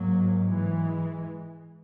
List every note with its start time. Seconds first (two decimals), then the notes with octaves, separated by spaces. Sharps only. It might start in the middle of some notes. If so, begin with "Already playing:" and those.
Already playing: G#2 F#3 A#3
0.46 E3 G#3